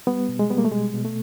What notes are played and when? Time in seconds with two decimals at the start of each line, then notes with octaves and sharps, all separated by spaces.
0.07 G3 B3
0.29 B2
0.39 G#3
0.50 G3 B3
0.58 A#3
0.65 A3
0.72 B2 G#3
0.94 B2
1.05 A3